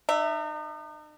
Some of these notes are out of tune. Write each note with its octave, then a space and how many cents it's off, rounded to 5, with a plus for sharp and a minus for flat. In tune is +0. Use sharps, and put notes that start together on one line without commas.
D#4 -40 E5 +0